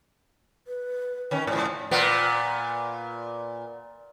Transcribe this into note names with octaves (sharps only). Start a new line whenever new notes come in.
B4
D#3 C#4 G5
G#2 F3 D5
A#2 B3